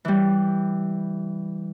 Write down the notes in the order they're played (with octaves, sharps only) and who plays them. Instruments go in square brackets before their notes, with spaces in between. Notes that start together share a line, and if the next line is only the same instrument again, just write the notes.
[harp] E3 G3